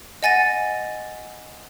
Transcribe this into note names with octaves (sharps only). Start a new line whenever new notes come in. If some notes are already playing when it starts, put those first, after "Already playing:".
D#5 F#5 G#5 A6 A#6 D#7